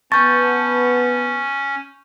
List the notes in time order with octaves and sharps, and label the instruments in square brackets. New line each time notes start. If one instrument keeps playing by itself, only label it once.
[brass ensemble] B3 [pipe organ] C#4 [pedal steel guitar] A5 [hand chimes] C#6 G6